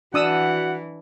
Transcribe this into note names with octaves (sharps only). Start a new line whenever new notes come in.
E3 D4 F#4 F#5 D#6 E6